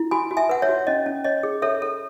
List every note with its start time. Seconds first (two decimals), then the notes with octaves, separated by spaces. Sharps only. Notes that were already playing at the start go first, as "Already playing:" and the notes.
Already playing: E4
0.11 F#4 G#5 B5
0.31 F#4
0.37 E5 G#5
0.49 B4 F#5
0.62 C#5 E5
0.69 F#4
0.87 C#4 D#5
1.06 C#4
1.24 C#5 D#5
1.43 G#4
1.62 A4 C#5 E5
1.82 A4